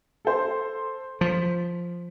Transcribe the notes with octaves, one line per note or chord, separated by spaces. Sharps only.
A4 C5
F3 B6